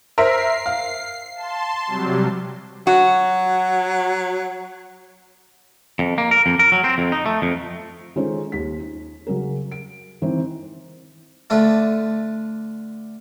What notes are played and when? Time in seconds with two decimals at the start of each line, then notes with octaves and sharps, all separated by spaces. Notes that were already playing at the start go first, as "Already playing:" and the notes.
0.18 A#4 C5 E5 C7
0.66 F5
1.36 A5 C6
1.87 C3 F#3 G3
2.87 F#3 F#4
5.99 F2
6.18 A#3
6.31 A#4
6.46 F2
6.59 A#4
6.72 F#3
6.84 C4
6.98 F2
7.12 D#4
7.26 A3
7.42 F2
8.16 D#3 G#3 C#4 F4 A4 C5
8.52 D#2 B6
8.80 D#4
9.27 C#3 F#3 C#4 A#4
9.72 D7
10.22 D#3 E3 C4
11.50 D3 A3 D4 F4